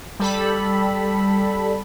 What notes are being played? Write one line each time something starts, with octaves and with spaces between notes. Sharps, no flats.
G3 A4 B5